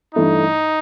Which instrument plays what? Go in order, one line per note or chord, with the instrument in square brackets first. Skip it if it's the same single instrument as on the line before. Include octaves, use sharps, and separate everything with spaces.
[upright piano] G2 E3 A3 E4 [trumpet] D#4